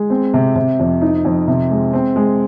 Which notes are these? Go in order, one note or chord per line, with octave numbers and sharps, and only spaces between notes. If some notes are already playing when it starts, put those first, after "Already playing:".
Already playing: G#3
C4
C3
C3
F2
D#4
F2
C3
G#3
C4
G#3